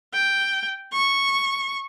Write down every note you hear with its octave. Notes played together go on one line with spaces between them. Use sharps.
G5
C#6